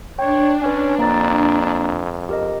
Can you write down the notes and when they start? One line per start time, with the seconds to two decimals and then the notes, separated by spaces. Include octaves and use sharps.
0.19 D4 C#5 G5
0.62 C#4 B4 C#5 G#5
0.98 F2 A#3 A#5 A6
2.29 G4 A#4 D#5